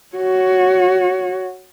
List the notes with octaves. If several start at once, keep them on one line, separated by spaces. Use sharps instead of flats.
F#4 C#5